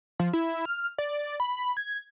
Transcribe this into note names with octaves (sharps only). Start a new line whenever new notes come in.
F3
E4
F6
D5
B5
G#6